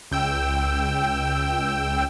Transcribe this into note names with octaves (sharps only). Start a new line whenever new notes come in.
C#2 G5 E6